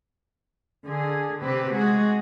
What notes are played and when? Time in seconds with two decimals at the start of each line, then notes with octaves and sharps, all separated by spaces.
0.85 D3 G#4
1.44 C3 C4 G4 B4
1.75 G#3 F#4 G#4